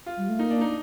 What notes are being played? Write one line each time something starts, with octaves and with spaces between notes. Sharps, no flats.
F4
G3
A3
A#3 D#4
D4
D#4